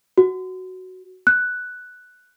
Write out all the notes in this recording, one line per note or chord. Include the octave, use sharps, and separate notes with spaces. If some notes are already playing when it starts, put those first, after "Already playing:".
F#4
F#6